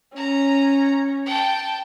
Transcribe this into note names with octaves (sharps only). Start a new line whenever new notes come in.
C#4 A#5
G5 A5